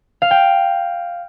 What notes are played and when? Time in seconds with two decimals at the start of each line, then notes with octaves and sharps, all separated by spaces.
0.22 F5
0.31 G5